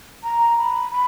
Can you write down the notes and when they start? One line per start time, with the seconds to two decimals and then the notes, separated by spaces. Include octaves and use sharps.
0.23 A#5
0.58 B5
0.91 B5